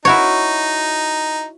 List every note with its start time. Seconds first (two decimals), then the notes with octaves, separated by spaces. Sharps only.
0.05 D#4 E4 F#4 C#5